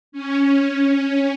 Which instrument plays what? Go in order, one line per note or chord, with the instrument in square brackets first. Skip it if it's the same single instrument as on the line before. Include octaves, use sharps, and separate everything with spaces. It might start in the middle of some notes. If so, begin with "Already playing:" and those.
[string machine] C#4